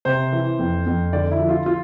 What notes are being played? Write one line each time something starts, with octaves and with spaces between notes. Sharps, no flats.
C3 C5
E3
F2
F2
D3 D5
E4
F3
F4
F4